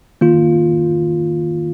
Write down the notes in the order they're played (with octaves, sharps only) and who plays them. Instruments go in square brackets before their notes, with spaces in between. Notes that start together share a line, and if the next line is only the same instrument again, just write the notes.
[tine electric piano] D#3 A#3 F4